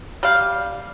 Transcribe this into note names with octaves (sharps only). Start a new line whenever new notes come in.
G3 F5